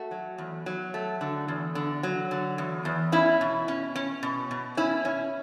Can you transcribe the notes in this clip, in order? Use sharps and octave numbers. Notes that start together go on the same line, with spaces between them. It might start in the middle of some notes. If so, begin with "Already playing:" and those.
Already playing: A3 F#4
F#3
E2
F#3
A3
D3
E2
D3
F#3
D3
E2
E2
C#4 E4
B2
C#4
C#4
B2
B2
C#4 E4
C#4